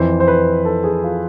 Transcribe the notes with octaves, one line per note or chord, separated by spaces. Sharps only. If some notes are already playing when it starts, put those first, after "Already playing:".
Already playing: F2 E3 C5
C5
B4
A4
G#4
F4